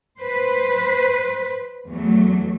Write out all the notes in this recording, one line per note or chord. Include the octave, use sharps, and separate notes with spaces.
B4 C5
E2 F#3 A3